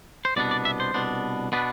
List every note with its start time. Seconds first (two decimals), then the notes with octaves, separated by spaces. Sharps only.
0.25 C5
0.36 C2 B2 B3 D4 D5
0.51 D5
0.65 E5
0.80 C5
0.94 C2 B2 B3 D4
1.52 B2 B3 D4 B4